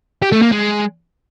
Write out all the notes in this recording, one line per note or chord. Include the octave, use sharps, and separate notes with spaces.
G4
A3
A#3
G#3